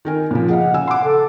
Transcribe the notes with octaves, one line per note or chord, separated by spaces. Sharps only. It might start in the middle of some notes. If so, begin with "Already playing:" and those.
D#3 A#4 G#5
A#2 C#3 F3
G#4 D#5 F5 F#5
C#3 G#5 E6
F#5 C6 D6
A4